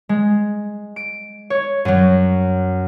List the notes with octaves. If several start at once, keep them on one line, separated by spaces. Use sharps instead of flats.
G#3
D7
C#5
F#2 F#3